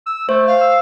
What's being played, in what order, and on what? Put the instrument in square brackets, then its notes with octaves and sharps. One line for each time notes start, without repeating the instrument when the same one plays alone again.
[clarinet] E6
[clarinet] A3 [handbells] C5
[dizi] F5
[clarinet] E6